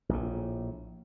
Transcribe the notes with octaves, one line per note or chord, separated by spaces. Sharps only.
A#1 A2